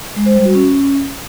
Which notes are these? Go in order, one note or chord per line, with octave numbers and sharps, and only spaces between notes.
G#3
C5
G3
F#4
C#4